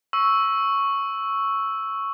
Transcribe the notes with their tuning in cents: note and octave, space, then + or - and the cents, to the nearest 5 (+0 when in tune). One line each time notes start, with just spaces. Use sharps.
C#6 +0 E6 +0